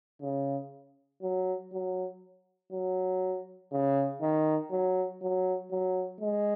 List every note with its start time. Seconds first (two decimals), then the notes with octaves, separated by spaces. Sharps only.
0.22 C#3
1.22 F#3
1.73 F#3
2.72 F#3
3.72 C#3
4.21 D#3
4.71 F#3
5.22 F#3
5.71 F#3
6.21 G#3